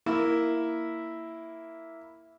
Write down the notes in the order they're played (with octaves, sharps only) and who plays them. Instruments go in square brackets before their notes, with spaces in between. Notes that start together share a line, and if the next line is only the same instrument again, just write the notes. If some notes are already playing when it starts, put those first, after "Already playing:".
[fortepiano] A#3 E4 E5